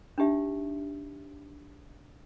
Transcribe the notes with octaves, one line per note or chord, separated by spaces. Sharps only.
D4 D#4 G4 E5